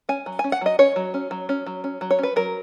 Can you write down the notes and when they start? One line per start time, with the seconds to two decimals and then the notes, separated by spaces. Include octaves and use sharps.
0.09 C#4 G#5
0.26 F#3
0.39 C#4 G#5
0.52 F#5
0.61 F#3 D#5
0.79 C#4 C#5
0.96 F#3
1.14 C#4
1.31 F#3
1.49 C#4
1.66 F#3
1.84 C#4
2.01 F#3
2.11 C#5
2.19 C#4 B4
2.36 F#3 A#4